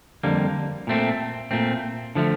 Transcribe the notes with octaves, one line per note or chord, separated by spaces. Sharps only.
F2 D3 G3 A#3
A#2 A3 C4
A#2 A3 C4
D3 F3 A3